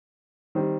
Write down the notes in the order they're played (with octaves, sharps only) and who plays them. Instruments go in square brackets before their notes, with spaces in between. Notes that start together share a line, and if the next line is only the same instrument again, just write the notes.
[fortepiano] D#3 G3 C4